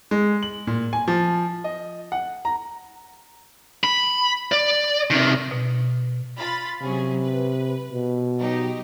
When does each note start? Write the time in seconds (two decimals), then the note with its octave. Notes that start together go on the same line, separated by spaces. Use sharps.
0.11 G#3
0.43 F#7
0.67 A#2
0.93 G#5
1.08 F3
1.64 D#5
2.12 F#5
2.45 A#5
3.84 B5
4.52 D5
5.10 C3 D#3
5.51 B2
6.37 F4 B5 A6
6.82 C3 F#3 C#4 G#4
7.22 B4
7.93 B2
8.38 F#3 D#4 G4